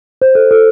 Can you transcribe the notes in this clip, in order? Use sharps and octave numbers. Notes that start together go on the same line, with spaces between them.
C5
A4
A4